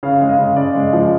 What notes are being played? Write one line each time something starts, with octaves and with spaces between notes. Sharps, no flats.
C#3 F5
G#3
D#5
C#3
C#3 D5
G#3
F3